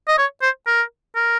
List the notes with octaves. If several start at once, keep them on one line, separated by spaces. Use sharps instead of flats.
D#5
C#5
C5
A#4
A#4